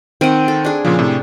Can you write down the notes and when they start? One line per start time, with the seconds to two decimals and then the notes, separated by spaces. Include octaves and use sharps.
0.21 D#3 C4 F#5 D7 D#7
0.48 A4
0.65 D4 G#4
0.85 A#2 C#3 F3
0.99 A2 C3